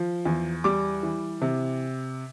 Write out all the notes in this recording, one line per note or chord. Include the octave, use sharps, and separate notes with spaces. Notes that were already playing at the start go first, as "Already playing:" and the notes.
Already playing: F3
E2
G3 D6
E3
C3